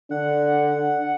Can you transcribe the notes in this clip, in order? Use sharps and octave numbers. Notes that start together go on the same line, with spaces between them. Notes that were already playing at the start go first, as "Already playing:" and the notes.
D3 D4 F#5